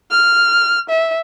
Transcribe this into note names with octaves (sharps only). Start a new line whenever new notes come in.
F6
E5